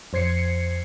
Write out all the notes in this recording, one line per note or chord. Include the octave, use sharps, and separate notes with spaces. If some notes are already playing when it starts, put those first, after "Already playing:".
F2 C5 G#6 C7 C#7